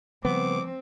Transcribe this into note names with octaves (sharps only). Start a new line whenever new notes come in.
C#3 F3 G3 B3 C4 D6